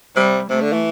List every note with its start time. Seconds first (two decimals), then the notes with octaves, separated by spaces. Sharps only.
0.16 C3 G3
0.50 C3 A3
0.61 D3
0.73 E3